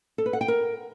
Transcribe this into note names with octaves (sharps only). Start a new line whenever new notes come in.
A4
B4
F#5
G5
A#4